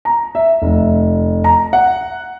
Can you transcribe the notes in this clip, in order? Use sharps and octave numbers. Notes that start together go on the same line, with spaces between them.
A#5
E5
F1
A#5
F#5